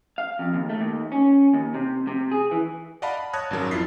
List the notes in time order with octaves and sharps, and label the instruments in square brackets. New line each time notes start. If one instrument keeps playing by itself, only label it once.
[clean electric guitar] F5
F2
D#2
A3
D#2
C#4
D#2
C3
C3
G#4
E3
[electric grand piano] D5 D#5 F5 F#5 A5 B5
B5
C#5 A5 D#6 F#6 G#6 A#6
G#1 F#2 F#3 A#4
F2 E4 F4 A6 B6 C7